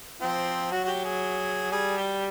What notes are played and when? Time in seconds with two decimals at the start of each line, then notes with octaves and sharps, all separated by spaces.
0.21 F3 C4
0.72 F#3 F#4
0.85 F#4
0.88 G4
1.05 G#4
1.72 G3 G#4
1.97 G4